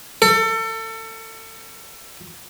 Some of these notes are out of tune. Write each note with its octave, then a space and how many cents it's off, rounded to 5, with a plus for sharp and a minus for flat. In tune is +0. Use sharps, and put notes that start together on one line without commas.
A4 +30